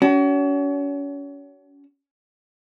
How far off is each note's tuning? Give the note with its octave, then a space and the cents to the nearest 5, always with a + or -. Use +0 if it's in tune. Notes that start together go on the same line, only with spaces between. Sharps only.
C#4 +35 F#4 +35